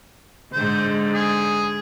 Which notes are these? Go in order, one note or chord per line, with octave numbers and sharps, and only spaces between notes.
G#2 D3 C5
G#4